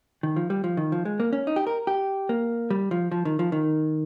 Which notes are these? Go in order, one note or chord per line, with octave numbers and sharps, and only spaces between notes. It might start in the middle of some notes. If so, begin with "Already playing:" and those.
D#3
F3
G3
F3
D#3
F3
G#3
A#3
C#4
D#4
G4
A#4
G4
A#3
G3
F3
F3
D#3
F3
D#3